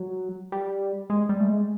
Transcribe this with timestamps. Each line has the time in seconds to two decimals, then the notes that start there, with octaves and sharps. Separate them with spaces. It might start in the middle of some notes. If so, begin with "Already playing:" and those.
Already playing: F#3
0.52 G3
1.10 G#3
1.29 G3
1.40 A3
1.48 G#3